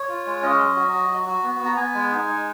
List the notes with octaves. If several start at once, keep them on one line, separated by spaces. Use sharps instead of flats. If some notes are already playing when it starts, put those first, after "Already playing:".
Already playing: C#5
F4
G#3
C#4 D#5
F#3
F#4
F#3
F#4
F#4
B3
B3
A#5
B3 G#5
G#3
D#4
G#3